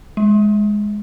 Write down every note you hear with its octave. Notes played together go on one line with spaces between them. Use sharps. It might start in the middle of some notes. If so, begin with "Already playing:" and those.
G#3